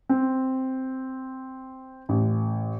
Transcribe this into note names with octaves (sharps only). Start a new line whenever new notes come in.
C4
A1